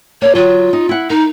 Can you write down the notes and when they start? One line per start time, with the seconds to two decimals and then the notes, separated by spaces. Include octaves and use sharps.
0.22 A#3 C#5 D5
0.35 F#3 F4
0.73 D#4
0.89 E4 F#5
1.10 D#4 A#4